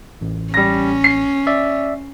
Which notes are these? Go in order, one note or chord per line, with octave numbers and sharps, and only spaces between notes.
A1
G3 C#4 A#6
C7
D5 E5